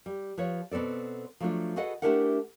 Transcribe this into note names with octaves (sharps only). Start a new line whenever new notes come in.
G3
F3 B4 C#5
B2 B3 C4 A4 D5
F3 F#3 A3 C4 D4 F4
F#4 G#4 A4 B4 D#5 F#5
A3 D4 E4 G4 A#4 F#5